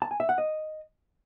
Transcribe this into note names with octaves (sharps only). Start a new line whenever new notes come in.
A5
G#5
E5
F#5
D#5